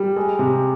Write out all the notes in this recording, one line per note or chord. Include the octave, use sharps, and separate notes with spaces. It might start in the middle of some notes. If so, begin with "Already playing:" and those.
Already playing: G3
G#3
C3